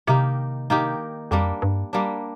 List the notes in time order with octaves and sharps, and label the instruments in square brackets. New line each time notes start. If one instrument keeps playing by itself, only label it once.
[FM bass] C3 [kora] D#3 A#3 D#4 G4
[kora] D#3 A#3 D#4 G4
[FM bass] F2 [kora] G3 A#3 D4
[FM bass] G2
[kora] G3 A#3 D4